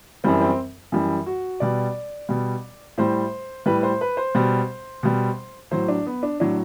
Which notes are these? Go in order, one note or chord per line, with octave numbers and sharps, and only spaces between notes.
F#2 E3 G3 C4
C4
F#2 E3 G3
F#4
B2 G3 D5
B2 G3
A2 G3 C5
A2 G3 B4
C5
B4
C5
B2 G3
B2 G3
A2 F#3 C5
D4
B3
D4
A2 F#3 D4